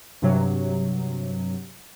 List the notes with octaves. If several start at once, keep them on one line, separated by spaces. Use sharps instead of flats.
G2 C3 F#3